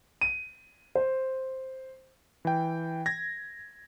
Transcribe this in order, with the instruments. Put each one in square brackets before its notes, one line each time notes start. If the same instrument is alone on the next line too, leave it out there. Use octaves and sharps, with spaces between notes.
[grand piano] D#7
C5
[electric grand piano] E3 G5
G#6 A#6